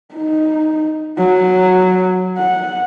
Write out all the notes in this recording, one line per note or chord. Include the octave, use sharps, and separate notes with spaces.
D#4
F#3
F#5